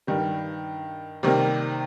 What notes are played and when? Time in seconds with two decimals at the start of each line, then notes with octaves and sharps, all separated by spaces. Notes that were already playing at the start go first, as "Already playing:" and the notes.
0.07 G2 D#3 G3
1.23 C3 D#3 G3 A#3